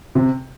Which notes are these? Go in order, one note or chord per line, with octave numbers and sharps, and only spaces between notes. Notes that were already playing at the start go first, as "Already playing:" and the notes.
C3